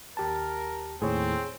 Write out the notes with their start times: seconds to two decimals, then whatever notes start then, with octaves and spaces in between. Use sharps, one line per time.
0.17 D#2 G4 A#4 A5
1.02 D#2 A2 C4 G#4 C#5